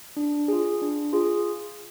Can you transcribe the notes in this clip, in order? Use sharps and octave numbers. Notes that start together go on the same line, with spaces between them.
D4
F4 G#4
D4
F4 G#4